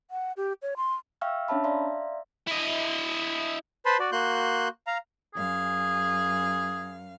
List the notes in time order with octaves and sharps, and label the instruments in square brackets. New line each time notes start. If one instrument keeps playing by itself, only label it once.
[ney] F#5
G4
C#5
C6
[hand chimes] E5 F5 G5 C#6 E6 F6
C#4 D4 C#5 E5 A5 B5
D5 E5 F5 A#5 C6
[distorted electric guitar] E4 D#5
[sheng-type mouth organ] B4 C5 A5 B5 C6
F#4 D5
A#3 F#4 C6 F#6 G6
F5 A#5
[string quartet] F#2 F5 [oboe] G#4